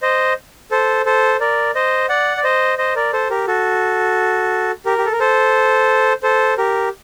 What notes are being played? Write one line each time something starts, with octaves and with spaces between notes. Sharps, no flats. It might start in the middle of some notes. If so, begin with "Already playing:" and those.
C5 D#5
A4 C5
A4 C5
A#4 D5
C5 D#5
D5 F#5
D5
C5 D#5
C5 D#5
A#4 D5
A4 C5
G4 A#4
F#4 A4
G4 A#4
G4
A4
A#4
A4 C5
A4 C5
G4 A#4